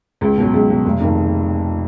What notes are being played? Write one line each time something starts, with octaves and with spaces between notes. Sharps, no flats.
C#2
B2 F#3
C#2
B2 F#3
F1
F2 D#3 A#3